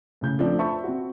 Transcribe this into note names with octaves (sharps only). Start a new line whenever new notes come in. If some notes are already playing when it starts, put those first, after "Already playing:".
A2 C#3 G6
F3 A3 C4 D4
C5 E5 A5 B5 C#6
C4 F#4